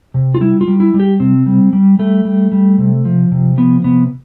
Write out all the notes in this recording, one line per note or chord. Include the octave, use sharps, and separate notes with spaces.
C3
F4
G3 E4
F4
G3
E4
G3
G4
C3 C4
G3
G3
G3 A3
G3
G3
C3
F3
C3
F3 B3
C3 B3